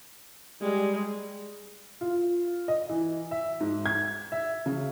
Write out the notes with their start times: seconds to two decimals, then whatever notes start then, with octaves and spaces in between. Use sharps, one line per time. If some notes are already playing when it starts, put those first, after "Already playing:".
0.61 G3 G#3
2.01 F4
2.68 D#5
2.89 E3
3.31 E5
3.60 G#2
3.86 G#6
4.32 E5
4.66 C#3